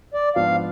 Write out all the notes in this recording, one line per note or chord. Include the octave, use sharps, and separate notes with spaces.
D5
G#2 F3 B3 D4 F5